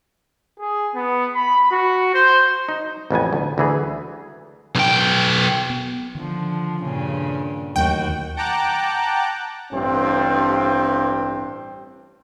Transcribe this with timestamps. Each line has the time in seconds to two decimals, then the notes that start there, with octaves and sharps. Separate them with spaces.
0.59 G#4
0.95 B3
1.34 B5
1.71 F#4
2.14 C5
2.69 D#4
3.11 A1 F2 B3 G#5
3.33 D2
3.58 D2 E3 G#4
4.75 B1 G5
5.70 B3
6.15 D3 D#3 F3
6.81 G2 A#2 C#3
7.76 D#2 F#3 A3 F#4 G5
8.36 F#5 G5 A5 A#5 D6 F#6
9.72 A1 G2 C4